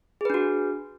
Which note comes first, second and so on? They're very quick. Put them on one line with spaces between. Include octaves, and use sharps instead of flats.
G#4 B4 D4 F#4